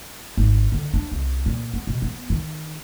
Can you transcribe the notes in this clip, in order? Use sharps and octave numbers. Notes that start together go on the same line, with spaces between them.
G#1
D3
D4
C2
A#2
B3
B2
B3
D#3